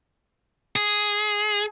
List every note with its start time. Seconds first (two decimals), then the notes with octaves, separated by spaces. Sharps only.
0.76 G#4